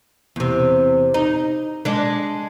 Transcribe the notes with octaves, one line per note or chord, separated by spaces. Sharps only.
E2 C3
D#4
G#3 D4